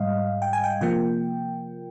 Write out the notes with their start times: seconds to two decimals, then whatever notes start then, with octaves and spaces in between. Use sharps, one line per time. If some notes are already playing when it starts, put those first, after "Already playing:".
Already playing: G#2 G3 D#5 F5
0.42 G5
0.53 G#5
0.64 G5
0.81 C3 F3 A#3 G5